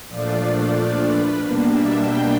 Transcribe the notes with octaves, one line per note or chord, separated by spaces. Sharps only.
A#2 F3 A3 D4 F4 D5
B4
B2 G3 A#3 D4
E5
G5